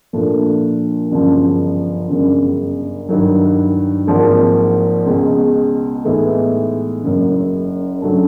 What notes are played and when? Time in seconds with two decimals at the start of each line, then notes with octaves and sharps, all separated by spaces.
0.13 A#2 F3 A3 D4
1.12 G1 F#2 C#3 F3
2.10 G1 F#2 C#3
3.09 G2 D#3 F#3
4.07 G#1 G#2 F3 A#3
5.06 C#2 B2 G#3
6.05 A2 E3 G#3 B3 D#4
7.03 F#1 F#2 C#3
8.02 C#3 F#3 A3 D4